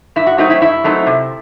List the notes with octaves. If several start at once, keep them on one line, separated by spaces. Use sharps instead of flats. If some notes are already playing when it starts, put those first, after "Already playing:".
G2 E4
F#4
F#3 A3 C4 D#4 F#4
E4
G2 E4
F#3 A3 C4 D#4
C3